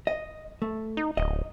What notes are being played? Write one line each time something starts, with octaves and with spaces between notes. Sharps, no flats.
D#5
A3
D#4
D1 D#5